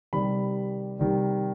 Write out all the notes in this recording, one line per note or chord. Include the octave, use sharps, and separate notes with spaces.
C3 D#3 G3 B5
C3 D#3 G3